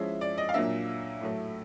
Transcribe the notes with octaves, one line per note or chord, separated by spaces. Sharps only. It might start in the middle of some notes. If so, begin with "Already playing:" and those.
Already playing: F3 G#3 C#4 E4 E5
D5
D#5
F5
A#2 F#3 A#3 D4 E5
A2 F#3 A3